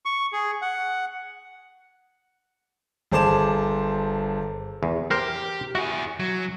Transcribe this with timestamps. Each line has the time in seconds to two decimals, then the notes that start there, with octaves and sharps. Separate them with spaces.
0.06 C#6
0.33 G#4
0.62 F#5
3.11 G1 G#4 C5 A5 D6 E7
4.83 E2
5.11 G4 A#4 C5
5.75 E4 F#4 G#4
6.20 F#3